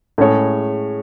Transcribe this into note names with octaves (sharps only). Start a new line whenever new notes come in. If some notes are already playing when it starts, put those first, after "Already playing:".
A2 G#3 C#4 G#4 C#5